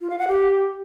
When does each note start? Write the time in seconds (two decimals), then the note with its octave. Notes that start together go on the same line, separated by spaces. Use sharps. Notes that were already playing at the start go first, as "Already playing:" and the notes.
0.01 F4
0.10 F5
0.19 F#5
0.28 G4